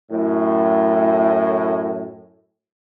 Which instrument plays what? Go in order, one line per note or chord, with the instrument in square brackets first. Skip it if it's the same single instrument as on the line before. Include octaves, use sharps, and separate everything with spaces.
[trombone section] F#2 A2